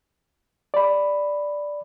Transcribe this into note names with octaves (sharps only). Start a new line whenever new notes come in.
D5 B5